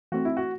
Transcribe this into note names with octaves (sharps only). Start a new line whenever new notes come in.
E3 A3 C4 F#4
E4
F#4